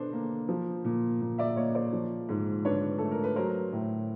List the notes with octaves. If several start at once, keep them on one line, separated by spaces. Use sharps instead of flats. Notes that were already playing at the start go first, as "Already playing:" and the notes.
Already playing: B2 D4 A4 B4 C5
A#3
F3
A#2
A#2
D5 E5
A#3 C#5 D#5
C5 D5
F3
G#2
D4 B4 C#5
A3 A4
A#4
B4
F#3 A#4 C5
A2